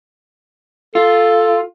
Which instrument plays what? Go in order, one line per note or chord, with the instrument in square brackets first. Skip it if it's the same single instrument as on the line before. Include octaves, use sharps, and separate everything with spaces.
[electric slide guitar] F4 [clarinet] A4